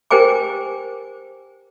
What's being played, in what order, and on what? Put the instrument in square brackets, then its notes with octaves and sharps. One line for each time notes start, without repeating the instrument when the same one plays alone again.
[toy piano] G4 A#4 C5 G5 G#5 D6